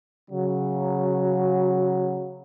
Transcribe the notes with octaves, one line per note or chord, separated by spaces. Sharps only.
C#3 F#3